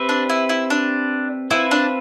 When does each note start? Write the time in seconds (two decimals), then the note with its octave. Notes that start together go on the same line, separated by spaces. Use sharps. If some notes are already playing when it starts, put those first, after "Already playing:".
Already playing: C4 G4 B4 E5
0.09 D4
0.30 E4
0.49 E4
0.70 D4
1.51 C4 E4 F4 B4 E5
1.71 D4